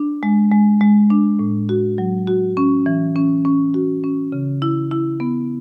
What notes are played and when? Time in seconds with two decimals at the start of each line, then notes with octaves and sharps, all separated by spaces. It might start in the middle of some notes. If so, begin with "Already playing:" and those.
Already playing: D4
0.23 G#3
0.52 G#3
0.81 G#3
1.10 D4
1.39 A2
1.69 F#4
1.98 F#3
2.27 F#4
2.57 C#4
2.86 E3
3.16 C#4
3.45 C#4
3.74 F#4
4.04 C#4
4.32 C#3
4.62 E4
4.91 E4
5.20 B3